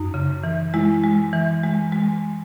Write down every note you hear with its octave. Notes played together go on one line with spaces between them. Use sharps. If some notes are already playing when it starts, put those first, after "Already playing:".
Already playing: F#2 D#4
C#3
E3
G#3 E4
G#3
E3
G#3
G#3